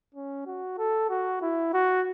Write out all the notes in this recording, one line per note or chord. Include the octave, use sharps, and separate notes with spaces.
C#4
F#4
A4
F#4
E4
F#4